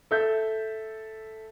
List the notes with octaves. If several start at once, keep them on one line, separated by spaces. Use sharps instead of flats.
A4 E5 G6